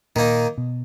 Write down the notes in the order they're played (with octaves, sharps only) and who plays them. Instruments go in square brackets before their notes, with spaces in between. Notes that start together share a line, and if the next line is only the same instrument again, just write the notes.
[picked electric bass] A#2 [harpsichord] D#3 A#3 D#4
[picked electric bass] B2